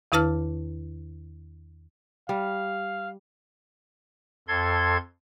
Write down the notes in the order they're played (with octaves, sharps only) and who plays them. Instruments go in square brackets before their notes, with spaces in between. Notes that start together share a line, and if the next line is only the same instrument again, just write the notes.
[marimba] E2 D#3 E4 B4 A5 F6
[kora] G3 [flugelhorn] F5
[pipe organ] F2 A4 C6 G#6